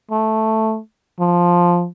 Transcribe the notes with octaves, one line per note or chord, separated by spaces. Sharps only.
A3
F3